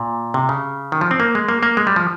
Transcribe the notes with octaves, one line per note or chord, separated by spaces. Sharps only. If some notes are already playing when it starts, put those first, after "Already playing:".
Already playing: A#2
C3
C#3
D#3
F3
C4
A#3
G#3
A#3
A#3
G#3
G3
F3